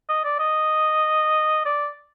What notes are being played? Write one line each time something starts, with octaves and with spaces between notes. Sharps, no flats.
D#5
D5
D#5
D5